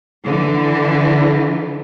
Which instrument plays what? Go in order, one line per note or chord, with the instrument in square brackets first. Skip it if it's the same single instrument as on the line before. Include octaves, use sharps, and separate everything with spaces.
[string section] D3 E3